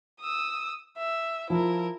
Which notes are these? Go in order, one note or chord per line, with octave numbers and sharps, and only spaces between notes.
D#6 E6
E5
F3 E4 A#4